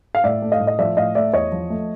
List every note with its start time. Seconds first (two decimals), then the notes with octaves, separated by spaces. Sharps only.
0.15 F5
0.24 A2 D5 E5
0.42 A3
0.52 D#5 F5
0.60 A2
0.67 D#5
0.79 F3 D5 E5
0.97 A2 D#5 F5
1.15 A3 D5 E5
1.34 E2 C#5 D#5
1.52 F3
1.70 A3